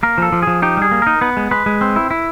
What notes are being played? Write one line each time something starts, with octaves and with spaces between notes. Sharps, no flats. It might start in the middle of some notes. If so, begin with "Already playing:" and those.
A#3 A#4
F3 A4
F3
F3 G#4
D#4 G4
G3 G#4
A#3
D#4 A#4
B3 B4
G#3
G#3 B4
G#3
C4
E4
E4